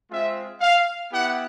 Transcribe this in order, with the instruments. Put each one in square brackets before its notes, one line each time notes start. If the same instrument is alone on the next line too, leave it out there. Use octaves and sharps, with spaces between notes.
[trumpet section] G#3 C4 F4 E5
F5
B3 E4 G4 F#5